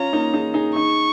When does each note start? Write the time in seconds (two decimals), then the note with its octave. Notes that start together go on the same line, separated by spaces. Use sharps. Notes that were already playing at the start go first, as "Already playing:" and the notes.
Already playing: C#4 F4 A#5
0.13 A#3 D#4
0.33 D#4 G#4
0.54 D#4 G#4
0.75 D#4 G#4 C#6